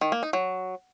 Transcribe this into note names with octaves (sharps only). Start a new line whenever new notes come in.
D#3
A#3
D#4
F#3